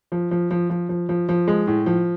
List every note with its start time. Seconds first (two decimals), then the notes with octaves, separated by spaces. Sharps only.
0.12 F3
0.31 F3
0.51 F3
0.70 F3
0.89 F3
1.09 F3
1.29 F3
1.48 G#3
1.67 A2
1.86 F3